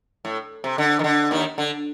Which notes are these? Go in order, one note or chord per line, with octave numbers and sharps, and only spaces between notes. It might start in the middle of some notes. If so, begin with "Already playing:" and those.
A2
C3
D3
D#3
D3
D#2 D#3
D3